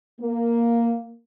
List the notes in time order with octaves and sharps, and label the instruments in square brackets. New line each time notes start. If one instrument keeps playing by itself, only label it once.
[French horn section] A#3